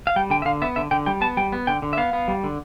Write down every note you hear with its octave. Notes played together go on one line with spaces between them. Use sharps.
F5
G3 G5
D3 G5
E5
D3 F5
B3 E5
D3 E5
D3 G5
G3 G5
B3 A5
G3 G5
B3
D3 G5
D3
E5
B3 F5
B3
G3
D3